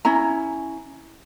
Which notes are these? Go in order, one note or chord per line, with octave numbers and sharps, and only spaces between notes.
C#4 E4 A#5